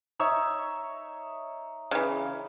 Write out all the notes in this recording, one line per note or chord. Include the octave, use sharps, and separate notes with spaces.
D#4 C#5 E5
C#3 E3